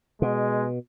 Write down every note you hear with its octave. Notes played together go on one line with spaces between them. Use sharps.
B2 G#3